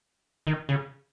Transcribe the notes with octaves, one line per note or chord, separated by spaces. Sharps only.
D#3
C#3